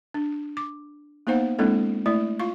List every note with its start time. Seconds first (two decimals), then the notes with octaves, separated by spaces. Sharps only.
0.14 D4
0.57 D6
1.27 A#3 B3 D#4 C5 F5 F#5
1.59 G#3 A#3 C4 D4 E4 A4
2.06 A3 E4 D5
2.39 F4 F5 C#6